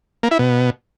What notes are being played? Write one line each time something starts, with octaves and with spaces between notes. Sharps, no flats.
A#3
E4
B2